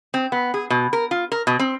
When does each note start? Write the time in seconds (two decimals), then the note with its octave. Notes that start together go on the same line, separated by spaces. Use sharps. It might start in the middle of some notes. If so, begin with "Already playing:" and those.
0.14 C4
0.32 B3
0.54 G#4
0.70 B2
0.93 A#4
1.11 F4
1.32 A#4
1.47 B2
1.59 C4